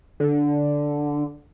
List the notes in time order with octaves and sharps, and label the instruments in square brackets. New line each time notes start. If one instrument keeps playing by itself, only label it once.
[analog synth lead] D3